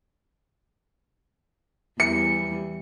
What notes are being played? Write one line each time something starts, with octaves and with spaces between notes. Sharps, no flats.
E2 E3 G3 C#7